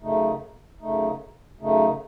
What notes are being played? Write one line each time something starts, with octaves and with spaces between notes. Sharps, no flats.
F#2 C#3 A3 D#4
F#2 C#3 A3 D#4
F#2 C#3 A3 D#4